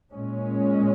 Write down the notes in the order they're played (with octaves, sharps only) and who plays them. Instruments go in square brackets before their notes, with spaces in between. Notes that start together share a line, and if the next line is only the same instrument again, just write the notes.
[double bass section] A#2 G#3 C#4